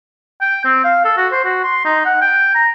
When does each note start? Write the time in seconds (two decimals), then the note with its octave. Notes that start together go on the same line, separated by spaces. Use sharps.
0.41 G5
0.65 C4
0.84 F5
1.05 A4
1.17 F#4
1.32 C5
1.45 F#4
1.64 C6
1.85 D#4
2.05 F#5
2.21 G5
2.55 A#5